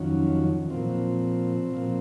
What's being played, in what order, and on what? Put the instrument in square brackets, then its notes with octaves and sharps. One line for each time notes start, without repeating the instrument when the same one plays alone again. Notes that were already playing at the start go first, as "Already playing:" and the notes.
Already playing: [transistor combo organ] F2 D#3 F#3 C#4
A#2 F3 C4
A#2 F3